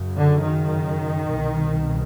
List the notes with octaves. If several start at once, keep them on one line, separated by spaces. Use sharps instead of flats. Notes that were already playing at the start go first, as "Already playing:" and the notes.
Already playing: F#2 C#3
D3
D#3
C2 B2